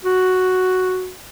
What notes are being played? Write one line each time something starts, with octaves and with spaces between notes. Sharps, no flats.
F#4